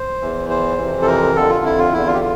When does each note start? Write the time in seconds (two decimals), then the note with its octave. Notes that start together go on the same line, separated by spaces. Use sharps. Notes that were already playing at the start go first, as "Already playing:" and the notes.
Already playing: C5
0.21 E2 E3
0.50 C5
0.78 F2 C3 E3
1.02 A4
1.07 A#4
1.35 F2 D3 A4
1.49 F4
1.65 E4
1.78 F4
1.92 E2 D3 E4
2.07 F4
2.14 G4
2.21 F4